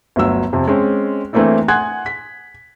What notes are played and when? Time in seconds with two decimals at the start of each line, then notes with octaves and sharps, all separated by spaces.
0.16 G1 D2 F#3 E6
0.53 F2 C3
0.68 G#3 C4 C#4
1.33 E3 A3 A#3 C4 D4 E4
1.68 F#5 G#5 C6 D#6 F#6 G#6
2.06 B6